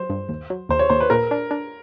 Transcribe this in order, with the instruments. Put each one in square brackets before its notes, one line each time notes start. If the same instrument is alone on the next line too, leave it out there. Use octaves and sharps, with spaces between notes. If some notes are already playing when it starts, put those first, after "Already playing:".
Already playing: [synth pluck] F#3 [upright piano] C5
[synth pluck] G2
D#2
F#3
[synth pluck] D#2 [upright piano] C5
[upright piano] C#5
[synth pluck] D#2 [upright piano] C5
[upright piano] B4
[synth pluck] A#2 [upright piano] A#4
[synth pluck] D4
D4